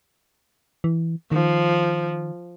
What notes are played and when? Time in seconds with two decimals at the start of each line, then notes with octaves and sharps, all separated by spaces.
0.84 E3
1.32 D#3 F3